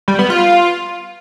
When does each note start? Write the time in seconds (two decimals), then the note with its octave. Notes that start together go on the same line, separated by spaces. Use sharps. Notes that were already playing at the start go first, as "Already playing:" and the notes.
0.08 G3
0.19 B3
0.30 F4